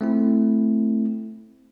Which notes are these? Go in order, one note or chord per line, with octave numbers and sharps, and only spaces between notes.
A3 C4 E4